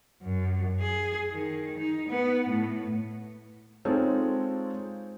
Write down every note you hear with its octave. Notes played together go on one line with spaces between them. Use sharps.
F#2
G#4
D#3
D#4
B3
A2
G#3 C4 D#4 F4 A4 C#5